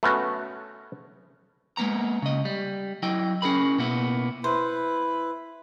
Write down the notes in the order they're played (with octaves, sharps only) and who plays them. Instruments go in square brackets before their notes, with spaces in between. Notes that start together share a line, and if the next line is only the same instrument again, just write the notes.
[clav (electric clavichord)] A3 B3 C#4 F#4
[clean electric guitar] G#3 A#3 B3 A#5
C#3 D#5
G3
F#3 E4 D#5 G5
C#4 G#4 A#4 B5
B2 A#3 B3 E4
[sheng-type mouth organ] E4 B4 [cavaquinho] C5